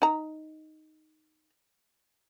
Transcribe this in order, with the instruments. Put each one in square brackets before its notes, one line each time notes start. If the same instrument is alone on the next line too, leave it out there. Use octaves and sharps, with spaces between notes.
[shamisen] D#4 A#5